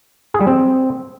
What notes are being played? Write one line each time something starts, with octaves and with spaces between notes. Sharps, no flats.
G#4
G3
C4